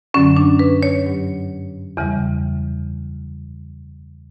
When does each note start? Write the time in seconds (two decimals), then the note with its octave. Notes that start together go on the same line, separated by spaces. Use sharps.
0.14 F#2 D3 F#3 C#4
0.37 D4
0.59 B4
0.83 C#5
1.06 G2 F#3
1.97 E2 C#3 E3 G3